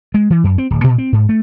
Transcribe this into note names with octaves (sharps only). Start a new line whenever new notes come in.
G#3
E3
F#2
C4
D1
A#2
C4
G#2
A3